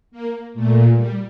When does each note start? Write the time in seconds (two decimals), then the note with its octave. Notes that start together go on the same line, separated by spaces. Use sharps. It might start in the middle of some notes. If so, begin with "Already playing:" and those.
0.11 A#3
0.54 A#2 A3
0.96 G3